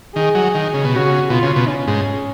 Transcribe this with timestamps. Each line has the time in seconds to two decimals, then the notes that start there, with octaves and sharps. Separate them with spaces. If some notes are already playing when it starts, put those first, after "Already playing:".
0.15 D#3 G#4
0.35 F#3
0.54 D#3
0.74 C#3
0.85 B2
0.92 C#3 F#4
1.30 B2 F4
1.43 C#3
1.56 B2
1.68 C#4
1.87 G#2